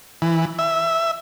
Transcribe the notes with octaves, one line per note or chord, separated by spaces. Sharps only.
E3
E5